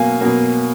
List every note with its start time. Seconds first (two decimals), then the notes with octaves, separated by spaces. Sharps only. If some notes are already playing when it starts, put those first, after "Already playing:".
Already playing: B2 F#3 A#3 F5 G#5
0.21 B2 F#3 A#3